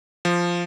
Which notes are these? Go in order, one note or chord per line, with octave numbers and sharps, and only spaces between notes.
F3